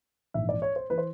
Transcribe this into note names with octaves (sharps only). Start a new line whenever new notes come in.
A#1 G#2 E3 E5
D5
C#5
C5
E3 B4
C5